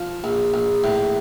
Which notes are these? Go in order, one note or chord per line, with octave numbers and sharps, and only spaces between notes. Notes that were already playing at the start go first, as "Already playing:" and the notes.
Already playing: F3
A#1
A#1
A2